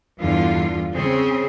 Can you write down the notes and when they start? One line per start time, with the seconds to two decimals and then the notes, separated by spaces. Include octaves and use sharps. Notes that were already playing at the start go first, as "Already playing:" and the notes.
0.20 E2 G2 D3 F4
0.95 C#3 C4 G#4